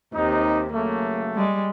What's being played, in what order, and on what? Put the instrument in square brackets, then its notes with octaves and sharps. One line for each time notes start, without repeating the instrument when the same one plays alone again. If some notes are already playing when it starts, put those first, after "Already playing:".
[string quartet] D#2 C3 [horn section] D#4
[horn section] C#3 F#3 A3 [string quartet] A#3
[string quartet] G3 G#3